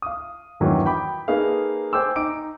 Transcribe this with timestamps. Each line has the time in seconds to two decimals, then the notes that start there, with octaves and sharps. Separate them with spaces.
0.02 F5 D#6
0.60 E2 G2 D#3 E3 F#3
0.86 G5 B5 D6
1.28 A#3 D#4 G#4 A4 B4 F5
1.93 C5 G5 G#5 D6 E6
2.16 D#4 D6 D7